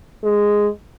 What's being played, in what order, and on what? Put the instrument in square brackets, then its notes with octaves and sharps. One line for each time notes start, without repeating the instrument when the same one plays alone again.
[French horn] G#3